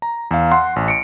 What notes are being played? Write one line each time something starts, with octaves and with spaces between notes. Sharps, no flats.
A#5
E2 F5
F#5 C6
A1
C#7 D7